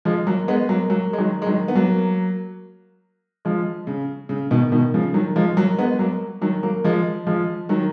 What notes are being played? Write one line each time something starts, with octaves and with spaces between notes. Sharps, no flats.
F3 G#3
F#3 A#3
G#3 B3
F#3 A#3
F#3 A#3
G#3
D#3 F#3
G#3
D#3 F#3
B3
F#3 A#3
F3 G#3
C#3
C#3
B2 D#3
B2 D#3
C#3 F3
D#3 F#3
F3 G#3
F#3 A#3
G#3 B3
F#3 A#3
D#3 F#3
F#3 A#3
F3 G#3
F3 G#3
D#3 F#3